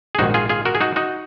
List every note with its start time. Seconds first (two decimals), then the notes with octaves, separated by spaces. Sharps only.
0.15 G#4
0.19 A#1 G#2 D#3 D#4 F#4
0.34 F4 G#4
0.49 F4 G#4
0.65 F#4 A#4
0.75 G#4
0.81 D#4 F#4
0.96 D#4 F#4